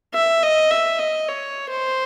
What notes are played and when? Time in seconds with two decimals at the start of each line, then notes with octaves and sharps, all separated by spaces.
0.14 E5
0.43 D#5
0.70 E5
0.99 D#5
1.28 C#5
1.70 C5